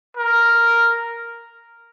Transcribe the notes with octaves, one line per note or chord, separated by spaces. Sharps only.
A#4